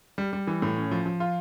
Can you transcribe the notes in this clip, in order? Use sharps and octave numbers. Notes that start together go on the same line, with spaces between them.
G3
G3
E3
A2
C#4
F3
F3
F4